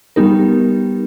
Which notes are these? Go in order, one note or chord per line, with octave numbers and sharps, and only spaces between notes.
G3 B3 D#4 G4 A#4